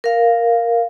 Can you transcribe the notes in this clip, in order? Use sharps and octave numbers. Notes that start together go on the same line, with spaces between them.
A#4 F5